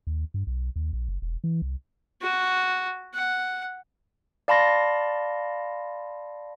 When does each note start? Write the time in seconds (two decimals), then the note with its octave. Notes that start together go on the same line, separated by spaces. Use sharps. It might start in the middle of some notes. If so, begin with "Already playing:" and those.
0.07 D#2
0.34 G2
0.47 B1
0.76 D#2
0.93 A#1
1.09 F#1
1.22 E1
1.44 E3
1.62 C2
2.22 F#4
3.14 F#5
4.48 D5 F5 A5 B5 C6 A#6